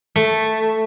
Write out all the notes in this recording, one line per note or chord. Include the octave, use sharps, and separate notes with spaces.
A3